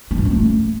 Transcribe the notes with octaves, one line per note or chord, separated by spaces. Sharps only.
D4
F3
C#4
A3